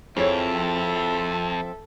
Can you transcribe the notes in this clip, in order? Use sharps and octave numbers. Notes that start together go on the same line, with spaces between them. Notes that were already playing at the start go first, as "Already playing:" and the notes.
F2 F3 C4 E4 G#4 A4 C#5 E5